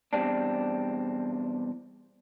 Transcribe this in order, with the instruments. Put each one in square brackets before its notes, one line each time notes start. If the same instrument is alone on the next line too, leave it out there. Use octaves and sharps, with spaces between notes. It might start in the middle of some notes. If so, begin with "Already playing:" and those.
[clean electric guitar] E2 B2 D#3 G3 C4 D4